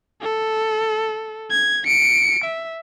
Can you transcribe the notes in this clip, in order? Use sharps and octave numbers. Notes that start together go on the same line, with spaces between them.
A4
G#6
C#7 D7
E5